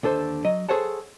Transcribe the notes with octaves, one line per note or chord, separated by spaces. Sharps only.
D#2 D3 A4 C5
F#3 D#5
G#4 A4 C5 C#5 F#5 A5